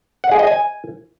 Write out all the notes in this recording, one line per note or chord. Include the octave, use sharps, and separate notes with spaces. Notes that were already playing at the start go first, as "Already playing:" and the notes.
F#5
G#4
D#5
G#5